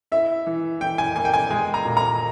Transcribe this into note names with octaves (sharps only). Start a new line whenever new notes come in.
E4 E5
E3
E3 G5
G#5
A#3 G#5
G5
G#5
G#3 G#5
A#5
A#2
A#5